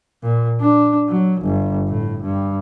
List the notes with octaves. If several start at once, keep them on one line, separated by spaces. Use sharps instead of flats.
A#2
D4
F#3
G1
A2
G2